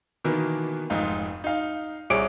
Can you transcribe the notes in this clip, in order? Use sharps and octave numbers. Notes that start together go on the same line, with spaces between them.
B2 D#3 E3 A#3 B3
F1 G#2 D#4 F4
D#4 F5
C2 G#4 C#5 D6 D7